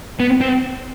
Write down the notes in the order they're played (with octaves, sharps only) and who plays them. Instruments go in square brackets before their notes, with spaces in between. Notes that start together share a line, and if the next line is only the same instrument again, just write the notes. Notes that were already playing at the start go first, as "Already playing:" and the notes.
[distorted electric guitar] B3
C4